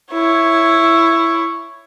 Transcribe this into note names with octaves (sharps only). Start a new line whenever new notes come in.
E4 C#5